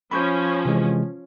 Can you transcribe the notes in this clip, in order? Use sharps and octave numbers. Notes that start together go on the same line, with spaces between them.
F3 C#4 B5 C#6 G6
C3 E3 G#3